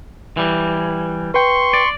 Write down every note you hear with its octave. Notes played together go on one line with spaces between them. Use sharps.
E3 G3
B4 G5 C6 C#6
D5